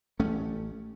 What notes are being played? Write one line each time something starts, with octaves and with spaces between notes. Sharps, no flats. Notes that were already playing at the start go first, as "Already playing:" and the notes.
A1 A3 C#4